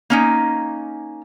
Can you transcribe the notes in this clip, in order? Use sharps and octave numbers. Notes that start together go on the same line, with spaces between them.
A#3 C#4 D#4